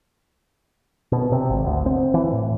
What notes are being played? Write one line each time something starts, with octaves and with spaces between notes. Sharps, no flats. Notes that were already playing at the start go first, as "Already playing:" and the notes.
B2
C3
G#1
D2
C4
E3
A2